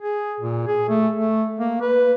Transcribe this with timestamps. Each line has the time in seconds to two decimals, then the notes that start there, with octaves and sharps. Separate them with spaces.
0.02 G#4
0.40 A#2
0.67 G#4
0.89 A3
1.16 A3
1.60 A#3
1.81 B4